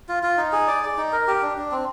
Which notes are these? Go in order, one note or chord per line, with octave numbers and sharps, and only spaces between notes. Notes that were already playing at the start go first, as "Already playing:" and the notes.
F4
F4
D#4
G#4
D5
D5
D#4
A#4
G4
D4
D4
C4